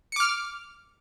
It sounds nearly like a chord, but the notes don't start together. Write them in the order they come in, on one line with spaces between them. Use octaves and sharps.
C#7 D6 F6